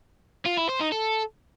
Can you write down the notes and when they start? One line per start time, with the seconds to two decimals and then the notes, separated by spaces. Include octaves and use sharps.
0.46 F4
0.58 E4
0.69 C5
0.81 D#4
0.92 A4